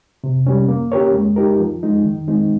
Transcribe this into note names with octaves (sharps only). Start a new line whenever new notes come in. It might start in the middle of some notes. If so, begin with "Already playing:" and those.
C3
G3 C#4
A#3
C#4 G4 A#4 C#5
G#3
D#4 G4 A#4
F3
G#3 D#4
D#3
G#3 C4 D#4